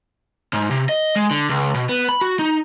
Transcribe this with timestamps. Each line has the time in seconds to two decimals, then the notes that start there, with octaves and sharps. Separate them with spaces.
0.53 G#2
0.70 C3
0.89 D#5
1.16 G#3
1.31 D3
1.49 C#2
1.75 B2
1.89 B3
2.09 B5
2.21 F#4
2.39 D#4